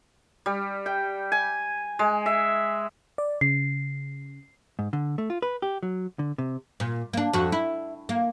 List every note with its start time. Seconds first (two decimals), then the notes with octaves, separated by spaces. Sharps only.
0.46 G3
0.86 G5
1.32 G#5
1.99 G#3
2.26 E5
3.18 D5
3.41 C#3 C7
4.79 G#2
4.93 D3
5.18 A3
5.30 F4
5.42 B4
5.62 G4
5.83 F#3
6.19 D3
6.38 C3
6.80 A#2
7.13 A#3 D4
7.33 F2 F#4
7.52 E4
8.09 A#3